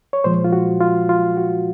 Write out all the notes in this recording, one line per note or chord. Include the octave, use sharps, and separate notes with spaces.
C#5
A#2 F3 G#3 C5
F4
F#4
F4
F4
F#4